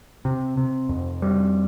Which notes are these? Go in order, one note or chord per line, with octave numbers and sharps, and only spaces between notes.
C3
C3
F2
G3